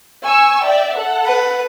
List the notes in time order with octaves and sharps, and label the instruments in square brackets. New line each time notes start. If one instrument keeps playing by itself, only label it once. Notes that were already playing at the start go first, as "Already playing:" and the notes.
[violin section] G#5 C#6 E6
D5 E5 G5
A4 F#5
[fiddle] B4